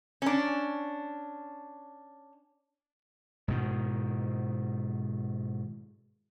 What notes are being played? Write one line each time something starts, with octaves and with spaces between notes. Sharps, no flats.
C#4 D4
G#2 B2 D#3